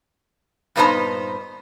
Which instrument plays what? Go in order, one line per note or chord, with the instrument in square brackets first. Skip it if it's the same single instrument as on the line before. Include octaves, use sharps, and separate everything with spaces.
[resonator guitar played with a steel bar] G2 A#2 B3 D#4 C5 A#5